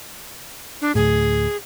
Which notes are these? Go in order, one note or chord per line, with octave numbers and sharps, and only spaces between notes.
D4
D2 A2 G#4